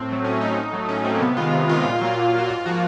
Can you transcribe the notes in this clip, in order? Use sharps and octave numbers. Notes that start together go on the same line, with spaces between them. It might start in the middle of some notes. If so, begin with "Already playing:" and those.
Already playing: A2 C4
F#3 A3
A2 C#4
F#3 A3 D#4
A2 D#4
F#3 A3
A2 C#4
F#3 A3 C4
A#3
C3 B3
D#3 G#3 F4
C3
D#3 G#3 F4
A#2
F#3 A#3
A#2
F#3 A#3 F#4
G#2 F4
F3 A#3 F#4